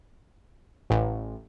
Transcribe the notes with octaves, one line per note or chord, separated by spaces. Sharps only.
A1